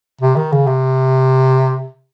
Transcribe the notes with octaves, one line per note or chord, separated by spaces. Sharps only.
C3
D#3
C#3
C3